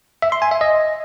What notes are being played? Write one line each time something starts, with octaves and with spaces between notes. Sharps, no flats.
E5
C6
G#5
E5
D#5